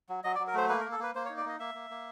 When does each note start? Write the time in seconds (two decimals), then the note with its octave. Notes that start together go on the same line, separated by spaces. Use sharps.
0.09 F#3
0.24 F#3 D#5
0.35 D5
0.39 F#3
0.47 A#4
0.54 A3 C5
0.69 A#3 B4
0.80 A#4
0.84 A#3
0.92 A4
0.99 A#3 B4
1.15 A#3 C5
1.25 C#5
1.29 D#4
1.37 D5
1.45 A#3 D#5
1.60 A#3 E5
1.74 A#3
1.90 A#3